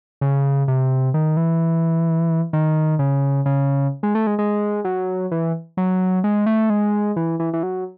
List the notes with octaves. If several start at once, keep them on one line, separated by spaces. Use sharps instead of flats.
C#3
C3
D#3
E3
D#3
C#3
C#3
G#3
A3
G#3
G#3
F#3
E3
F#3
G#3
A3
G#3
E3
E3
E3
F#3